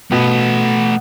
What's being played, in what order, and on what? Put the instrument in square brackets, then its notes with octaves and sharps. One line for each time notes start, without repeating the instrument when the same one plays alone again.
[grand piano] B2 [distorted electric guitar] A3 B4